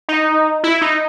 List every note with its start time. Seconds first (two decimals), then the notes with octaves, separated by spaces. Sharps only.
0.09 D#4
0.64 E4
0.82 D#4